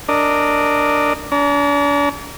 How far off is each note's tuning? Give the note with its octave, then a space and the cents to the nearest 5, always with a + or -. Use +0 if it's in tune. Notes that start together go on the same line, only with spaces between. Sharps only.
D4 +0 A#4 -15 D#5 +0
D4 -40 A#5 +0